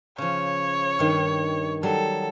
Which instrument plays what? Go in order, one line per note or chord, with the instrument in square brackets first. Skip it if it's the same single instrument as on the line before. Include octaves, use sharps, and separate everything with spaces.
[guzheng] C#3 F3 [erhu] C#5
[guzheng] G2 D#3
[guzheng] F#3 G3 [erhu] A4